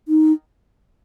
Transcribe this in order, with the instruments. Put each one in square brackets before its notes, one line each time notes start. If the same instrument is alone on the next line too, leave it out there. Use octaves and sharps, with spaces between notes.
[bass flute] D#4